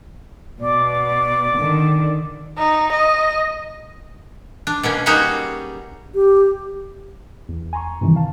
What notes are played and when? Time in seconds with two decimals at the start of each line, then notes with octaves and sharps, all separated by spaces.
0.60 B2 D5
1.59 D3 D#3
2.58 D#4
2.93 D#5
4.67 D4
4.83 B2 A#3 C#4
5.06 G3 A#3 C#4 D#4 F#4 G#4
6.15 G4
7.49 E2
7.73 G#5 A#5 C6 C#6
8.01 G2 C3 D#3 E3
8.16 F5 A5